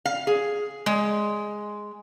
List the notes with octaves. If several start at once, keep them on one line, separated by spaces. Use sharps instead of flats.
F5
G#4
G#3